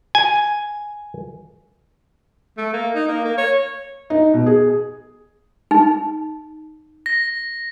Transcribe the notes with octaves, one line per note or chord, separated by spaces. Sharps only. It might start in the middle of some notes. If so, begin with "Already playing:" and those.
G#5
A3
A#3
D#4
A#3
A#3
C#5
D#4
B2
G#4
D#4
A#6